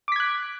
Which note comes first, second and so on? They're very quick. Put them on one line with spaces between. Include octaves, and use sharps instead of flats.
D6 B6 G#6 F#6